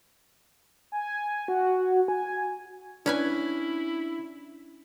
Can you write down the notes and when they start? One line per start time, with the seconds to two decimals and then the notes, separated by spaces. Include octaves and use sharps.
0.92 G#5
1.48 F#4
2.08 G#5
3.06 C#4 D4 E4 B4 G#5